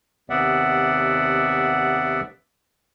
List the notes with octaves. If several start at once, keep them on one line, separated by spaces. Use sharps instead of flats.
D#2 C3 B3 D5 E5 F#5